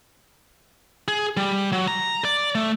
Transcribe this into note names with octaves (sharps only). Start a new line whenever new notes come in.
G#4
G3
F#3
A#5
D5
A3